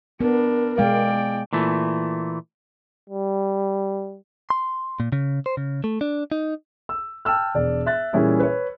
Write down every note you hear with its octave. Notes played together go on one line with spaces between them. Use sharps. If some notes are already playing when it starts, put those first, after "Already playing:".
B3 D4 A#4
B2 G#3 D5 F5 G5
A#2 E3 A3
G3
C6
A#2
C#3
C5
C#3
A3
D4
D#4
E6
G5 A5 E6 F6
E1 D5
E5 F#6 A6
A#2 E3 G3 C#4 E4 G#4
B4 C#5